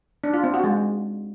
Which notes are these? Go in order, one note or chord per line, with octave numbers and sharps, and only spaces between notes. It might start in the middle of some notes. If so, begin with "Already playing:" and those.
D4
F4
C4
F#4
G#3